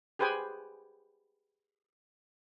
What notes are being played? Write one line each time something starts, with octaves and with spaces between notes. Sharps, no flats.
G4 G#4 B4 C5 G5 G#5